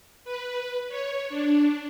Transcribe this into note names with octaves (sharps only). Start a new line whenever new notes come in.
B4
C#5
D4